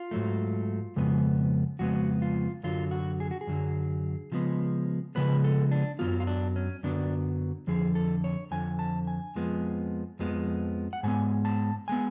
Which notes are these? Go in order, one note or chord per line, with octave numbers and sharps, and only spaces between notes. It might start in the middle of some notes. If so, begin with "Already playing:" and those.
Already playing: F4
G#2 F#3 A3
F2 C#3 G#3 B3
F2 C#3 G#3 B3 F#4
F4
F#2 D3 F#3 F4
F#4
G#4
F#4
G#4
F#2 D3 F#3
C#3 F3 G#3 B3
C#3 F3 G#3 B3 B4
A4
D4
F#2 D3 F#3 B3 F4
F4
D4
C#4
F#2 D3 F#3 B3 D4
F2 D3 F3 G#4
A4
C#5
F2 D3 F3 G#5
A5
G#5
F2 F3 G#3 B3
F2 F3 G#3 B3
F#5
G#2 G#3 B3 G#5
A5
G#3 B3 G#5